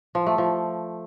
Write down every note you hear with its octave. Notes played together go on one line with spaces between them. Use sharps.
F3
A3
F3